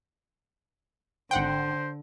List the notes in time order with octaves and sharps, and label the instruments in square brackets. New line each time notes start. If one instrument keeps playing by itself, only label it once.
[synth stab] G#1 F#5 G5 [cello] D3 [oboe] C5